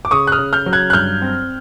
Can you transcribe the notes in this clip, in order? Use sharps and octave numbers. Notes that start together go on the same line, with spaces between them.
D6
C#3 C#6 D#6
F#6
D#6 F6
C#3
F6 G6
F#3
F#6 G#6
F#6
G2 F6 G6
C4